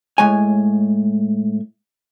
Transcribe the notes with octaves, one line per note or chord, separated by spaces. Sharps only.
A2 G#3 C#5 G#5